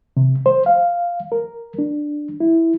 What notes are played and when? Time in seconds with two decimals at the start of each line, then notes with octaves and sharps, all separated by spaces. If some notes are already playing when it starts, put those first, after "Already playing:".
0.17 C3
0.46 C5
0.66 F5
1.32 A#4
1.79 D4
2.40 E4